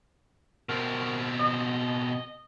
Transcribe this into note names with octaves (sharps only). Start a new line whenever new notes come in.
B2 C4 A#4
D#5